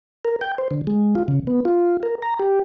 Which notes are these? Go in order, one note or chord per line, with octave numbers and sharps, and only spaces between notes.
A#4
G5
C5
D3
G#3
F4
C#3
B3
F4
A#4
A#5
G4